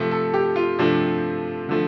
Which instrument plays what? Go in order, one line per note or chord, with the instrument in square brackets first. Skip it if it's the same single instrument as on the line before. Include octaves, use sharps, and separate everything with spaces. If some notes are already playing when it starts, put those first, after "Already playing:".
Already playing: [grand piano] C3 F3 A3
A4
G4
F4
C3 F3 A3 D4
D3 F3 A3